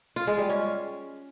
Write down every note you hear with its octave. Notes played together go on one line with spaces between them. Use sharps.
F4
G#3
G3
C#4